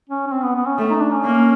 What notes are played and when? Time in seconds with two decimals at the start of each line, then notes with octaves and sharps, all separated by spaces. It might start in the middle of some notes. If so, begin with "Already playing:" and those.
0.09 C#4
0.27 C#4
0.32 C4
0.44 B3
0.56 B3
0.66 C#4
0.78 A3
0.90 D#4
1.00 D4
1.12 C#4
1.24 A#3